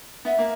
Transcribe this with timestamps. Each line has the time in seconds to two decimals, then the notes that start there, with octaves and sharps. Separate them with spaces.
0.25 B3 E5
0.38 A#3